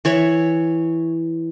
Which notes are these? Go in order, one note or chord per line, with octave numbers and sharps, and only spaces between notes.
E3 C#5 E5